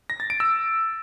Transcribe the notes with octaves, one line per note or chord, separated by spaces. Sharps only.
A#6
A6
D7
E6